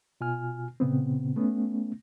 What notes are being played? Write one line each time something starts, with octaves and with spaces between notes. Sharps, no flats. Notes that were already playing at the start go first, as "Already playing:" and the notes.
B2 F4 G#5 F6
A#2 C#3 B3 C4
A3 B3 C#4